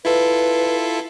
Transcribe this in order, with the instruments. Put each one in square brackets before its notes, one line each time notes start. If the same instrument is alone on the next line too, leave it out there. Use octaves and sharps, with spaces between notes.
[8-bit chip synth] E4 F4 A4 [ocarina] B4